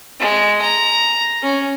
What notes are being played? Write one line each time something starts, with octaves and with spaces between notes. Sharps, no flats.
G#3
A#5
C#4